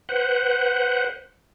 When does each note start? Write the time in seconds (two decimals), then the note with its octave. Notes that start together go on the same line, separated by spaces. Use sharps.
0.09 B4 C5 F#5